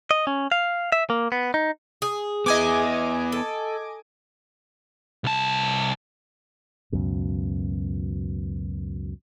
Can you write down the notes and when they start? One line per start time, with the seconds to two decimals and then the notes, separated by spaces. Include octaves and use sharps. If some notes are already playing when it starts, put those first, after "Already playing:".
0.11 D#5
0.27 C#4
0.52 F5
0.92 E5
1.10 A#3
1.32 B3
1.54 D#4
2.02 G#4
2.46 B3 E4 D#5 G#5 D6
3.32 A4
5.24 C2 A5
6.92 C#2 F#2 B2